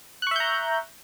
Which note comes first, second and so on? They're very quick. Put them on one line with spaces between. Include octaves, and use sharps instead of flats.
F#6 C#6 E5 G6 A#5